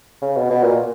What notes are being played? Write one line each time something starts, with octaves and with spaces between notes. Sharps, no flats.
C#3
B2
B2
A#2